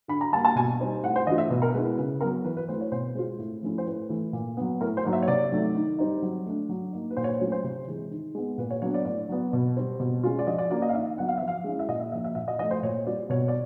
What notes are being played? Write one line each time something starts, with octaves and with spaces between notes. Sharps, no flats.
D3 B5
A#5
G3 A#3 A5
A5
B2 G#5
G3 C4 D#4
A2 F#5
C5
E3 A3 D4 F4 D#5
E5
B2 B4
A#4
G#3 B3 E4 B4
C#3 B4
F#3 B3 A#4
E3 B4
B4
A3 C4 E4 C5
C#5
B2 C5
G#3 C4 F4
A2
F3 A3 C#4 E4
C5
A2 B4
E3 A3
A#2
F#3 B3
A2 A#4
C5
F#3 A#3 D#4
E5
C#5
C3 D5
D#3 F#3 A3
D#3
G3 C4 D#4
F#3
A3 D4
F#3
A#3 D#4
B4
A#2 C5
C#5
C5
F#3 A3 C#4 F4 C#5
C5
C3
E3 G#3
D#3
G#3 B3
A#2 B4
C#5
F#3 B3 D4 C#5
D5
A2 D5
F#3 B3
B2
G3 C4
B2
G#3 C#4 F4
D5
F3 D#5
D5
A#3 C#4 F4 D5
D#5
F5
D#3 E5
F#3 B3 F#5
F5
F3 E5
F5
G#3 C#4 E4
E5
A#2 D#5
E5
F3 A#3 E5
E5
A#2 E5
D#5
F3 A3 D#5
C5
A#2 C#5
G3 C4 F4 D5
B2 C#5
D5